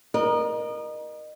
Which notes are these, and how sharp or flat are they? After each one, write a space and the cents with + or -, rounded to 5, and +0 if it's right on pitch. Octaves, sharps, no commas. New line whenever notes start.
A#4 +25 D#5 -30